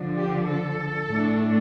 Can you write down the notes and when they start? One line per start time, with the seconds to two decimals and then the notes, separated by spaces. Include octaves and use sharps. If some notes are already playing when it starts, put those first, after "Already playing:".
Already playing: D3 F3 D4
0.19 G4
0.49 A4
1.10 A2 A3 D4